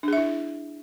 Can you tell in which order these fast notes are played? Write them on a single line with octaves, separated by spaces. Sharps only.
D4 G#4 E5 E4